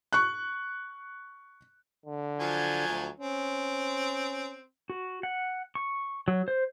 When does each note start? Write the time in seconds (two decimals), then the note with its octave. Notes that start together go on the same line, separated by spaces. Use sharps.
0.13 C#6 F#6
2.06 D3
2.40 F3 F#3 G#5
2.88 D2
3.20 C4 C#4
4.90 F#4
5.23 F#5
5.75 C#6
6.28 F#3
6.48 C5